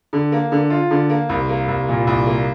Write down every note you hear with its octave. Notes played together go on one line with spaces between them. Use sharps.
D3
A#3
D3
F4
D3
A#3
C2
A#3
C2
A#2
C2
A#3